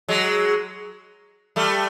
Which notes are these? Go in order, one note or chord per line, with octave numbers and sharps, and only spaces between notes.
F#3 G#3
G3 A3